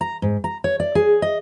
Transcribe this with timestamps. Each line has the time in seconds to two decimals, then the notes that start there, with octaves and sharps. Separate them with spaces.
0.01 A#5
0.22 G#2
0.44 A#5
0.64 C#5
0.80 D5
0.95 G#4
1.22 D#5